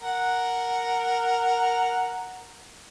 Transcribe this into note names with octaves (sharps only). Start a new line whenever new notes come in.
A#4 F#5